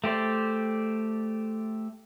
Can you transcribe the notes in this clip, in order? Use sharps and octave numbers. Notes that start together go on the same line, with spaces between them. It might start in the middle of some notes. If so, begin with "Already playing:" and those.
A3 G4 C5 D5